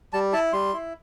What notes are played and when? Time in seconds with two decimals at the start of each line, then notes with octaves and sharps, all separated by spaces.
0.13 G3 A5
0.33 E4 A5
0.53 G3 C6
0.73 E4